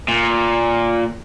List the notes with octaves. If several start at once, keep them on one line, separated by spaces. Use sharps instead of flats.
A#2